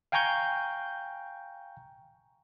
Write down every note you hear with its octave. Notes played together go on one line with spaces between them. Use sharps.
F5 G5 G#5 A#5 C#6 G6